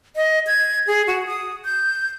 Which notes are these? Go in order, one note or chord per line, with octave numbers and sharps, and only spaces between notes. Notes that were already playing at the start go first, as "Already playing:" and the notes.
D#5
G#6
G#4
F#4
D#6
G6